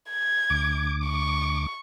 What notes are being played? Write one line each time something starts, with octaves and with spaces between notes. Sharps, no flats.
G#6
D2 D6
C#6